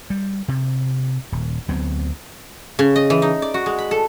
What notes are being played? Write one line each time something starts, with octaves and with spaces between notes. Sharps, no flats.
G3
C3
D#1
D2 F#3 B3 C4
C#3
D#5
E3
D#4
D5
F#4
G#3
B5
A4